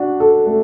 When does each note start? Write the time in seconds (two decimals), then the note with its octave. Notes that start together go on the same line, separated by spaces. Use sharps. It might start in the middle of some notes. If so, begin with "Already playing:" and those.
Already playing: D4 F#4
0.20 A4
0.47 A3